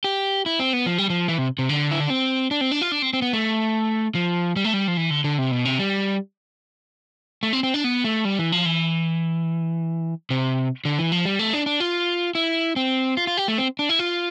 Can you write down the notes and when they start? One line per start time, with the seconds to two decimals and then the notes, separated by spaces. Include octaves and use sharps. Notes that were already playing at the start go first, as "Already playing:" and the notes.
0.04 G4
0.46 E4
0.59 C4
0.73 B3
0.86 F3
0.98 G3
1.10 F3
1.28 E3
1.38 C3
1.59 C3
1.69 D3
1.91 E4
2.00 D4
2.10 C4
2.51 D4
2.61 C4
2.71 D4
2.82 F4
2.92 D4
3.02 C4
3.13 C4
3.22 B3
3.33 A3
4.15 F3
4.56 G3
4.64 A3
4.74 G3
4.88 F3
4.97 E3
5.10 D3
5.24 D3
5.38 C3
5.51 B2
5.65 C3
5.79 G3
7.43 A3
7.53 C4
7.63 C4
7.74 D4
7.84 B3
8.04 A3
8.25 G3
8.39 E3
8.52 F3
8.66 E3
10.30 C3
10.85 D3
10.99 E3
11.12 F3
11.25 G3
11.39 A3
11.53 D4
11.66 D4
11.80 F4
12.35 E4
12.76 C4
13.17 F4
13.27 F4
13.37 G4
13.48 A3
13.58 C4
13.79 D4
13.89 E4
13.99 F4